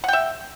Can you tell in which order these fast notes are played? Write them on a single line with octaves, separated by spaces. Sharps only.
F#5 G5 E5